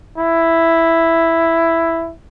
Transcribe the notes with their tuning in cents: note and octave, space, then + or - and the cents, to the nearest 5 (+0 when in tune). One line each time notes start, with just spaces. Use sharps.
E4 +5